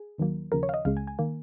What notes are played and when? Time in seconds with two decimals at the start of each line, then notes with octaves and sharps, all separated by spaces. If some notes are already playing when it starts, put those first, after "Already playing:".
Already playing: G#4
0.18 D#2 D#3 F#3 A#3
0.52 D#2 C#3 F3 A#4
0.63 C#5
0.69 F5
0.74 D#5
0.85 C#2 C#3 G#3 F5
0.97 G#5
1.07 G#5
1.19 D#3 A#3